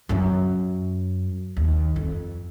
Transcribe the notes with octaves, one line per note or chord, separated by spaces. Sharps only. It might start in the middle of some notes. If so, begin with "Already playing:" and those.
F#2 C#4
D#2
F2